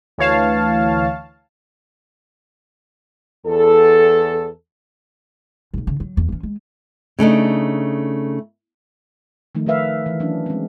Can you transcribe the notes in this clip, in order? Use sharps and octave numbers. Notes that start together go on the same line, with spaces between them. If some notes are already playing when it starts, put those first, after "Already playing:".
D2 E3 C#5 F5 A5
E2 A4
B1 B2
C#3
F#3
E2
E3 C#4
G#3
C#3 A3 D4 D#4
D#3 F3 A3 D#4
A3 A#4 B4 E5 F5
E3
E3 F#3 C#4 D4
G#3 C4